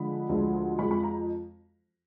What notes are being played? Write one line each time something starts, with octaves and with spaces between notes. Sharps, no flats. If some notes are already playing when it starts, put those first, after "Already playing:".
Already playing: D3 F3 G#3 B5
D2 D3 F3 G#3
F2 F3 G#3 B5
B5
A#5